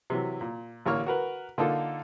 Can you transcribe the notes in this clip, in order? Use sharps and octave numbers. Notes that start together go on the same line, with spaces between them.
C3 E3 F#3
A#2
A1 D3 A#3 C#5 C#6 F6
F#4 A#4 B4
D3 A#3 D#4 F4 A4